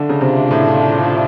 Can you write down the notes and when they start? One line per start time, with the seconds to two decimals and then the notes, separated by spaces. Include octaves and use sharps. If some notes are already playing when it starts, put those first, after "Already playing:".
Already playing: D3 A3 D4 F4
0.09 C#3
0.21 C3
0.51 A2